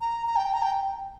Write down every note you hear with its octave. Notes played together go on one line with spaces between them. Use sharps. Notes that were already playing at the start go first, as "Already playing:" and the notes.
A#5
A#5
G5
A#5
G5